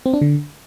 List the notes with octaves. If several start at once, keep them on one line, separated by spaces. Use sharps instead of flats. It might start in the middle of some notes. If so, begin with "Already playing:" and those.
C4
D4
D3